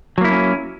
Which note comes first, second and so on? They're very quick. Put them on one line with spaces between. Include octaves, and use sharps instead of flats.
F#3 A#3 E4 A3 C#4